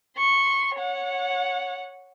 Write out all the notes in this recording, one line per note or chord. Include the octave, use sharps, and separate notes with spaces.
C6 C#6
C#5 F#5